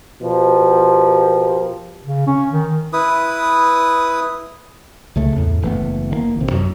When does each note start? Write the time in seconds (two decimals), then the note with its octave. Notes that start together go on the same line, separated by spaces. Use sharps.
0.22 B2 F3 G4 A#4
2.05 C#3
2.27 C#4
2.53 D#3
2.93 E4 B4 D#6
5.16 C#2 C#3 A3
5.36 E2 A2
5.63 F#1 E3 A3 B3
6.11 D#3 A3 A#3
6.37 A1 C3
6.51 F#2